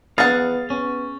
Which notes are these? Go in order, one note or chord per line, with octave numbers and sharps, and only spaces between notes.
B3 G#4 F5 F#5 A6
B3 C#4